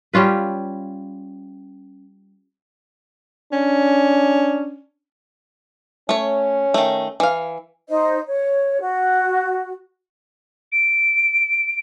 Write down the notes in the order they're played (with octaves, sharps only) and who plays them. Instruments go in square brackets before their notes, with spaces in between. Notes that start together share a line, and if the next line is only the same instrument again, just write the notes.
[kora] G3 C#4 F4 B4
[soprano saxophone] C#4 [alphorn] D4
[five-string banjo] A3 C#5 [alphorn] C#4
[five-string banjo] D#3 A3
E3 F5
[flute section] D#4 C5 D#5
C#5
F#4
[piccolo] D7